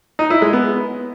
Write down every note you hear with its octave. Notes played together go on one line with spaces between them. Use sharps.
D#4
E4
G#3
B3